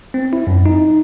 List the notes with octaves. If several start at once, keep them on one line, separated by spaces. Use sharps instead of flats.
C4
E4
F#2
D#4